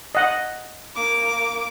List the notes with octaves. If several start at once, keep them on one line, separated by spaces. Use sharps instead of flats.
D#5 F#5
A#3 D6